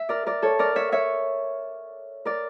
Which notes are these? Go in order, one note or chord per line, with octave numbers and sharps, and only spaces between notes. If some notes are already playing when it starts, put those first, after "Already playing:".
Already playing: E5
A#4 D5
A#4 D5
A4 C#5
A#4 D5
C#5 E5
C#5 E5
A#4 D5